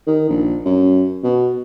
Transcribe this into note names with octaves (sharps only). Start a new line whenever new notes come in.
D#3
A#1
F#2
B2